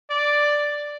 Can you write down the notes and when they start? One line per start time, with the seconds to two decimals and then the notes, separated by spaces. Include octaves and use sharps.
0.10 D5